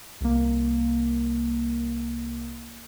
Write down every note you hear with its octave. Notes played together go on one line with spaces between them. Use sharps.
C2 A#3